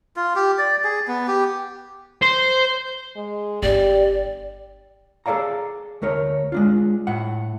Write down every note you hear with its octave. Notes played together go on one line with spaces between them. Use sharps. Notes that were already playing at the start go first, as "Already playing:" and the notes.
F4
G4
D5
G#4
B3
G4
C5
G#3
G1 G4 D5
G#4 A4 C#5 D5 F5 A#5
D2 A3 A#4 C#5
G#3 D4 F4
A2 F#5